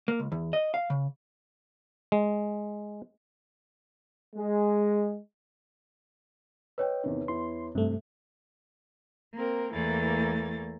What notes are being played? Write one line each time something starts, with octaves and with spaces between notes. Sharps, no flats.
A#3
C#2
E2
D#5
F5
C#3
G#3
G#3
B4 C#5 D#5 G5
E2 C3 D#3
E2 E4 C6
G2 C3 A3
A#3 C4 A#4
E2 E3 A3 A#3 A6